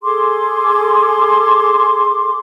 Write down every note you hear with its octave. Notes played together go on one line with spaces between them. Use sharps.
G#4 A4 C6 D6